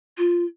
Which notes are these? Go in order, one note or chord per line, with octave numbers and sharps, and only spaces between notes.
F4